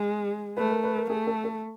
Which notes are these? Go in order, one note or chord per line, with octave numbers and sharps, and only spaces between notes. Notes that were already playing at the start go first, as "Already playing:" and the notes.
Already playing: G#3
A3 B4
A#4
B4
A#4
A3 G#4
A4
A4